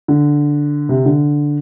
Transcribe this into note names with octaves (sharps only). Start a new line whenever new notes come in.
D3
C3
D3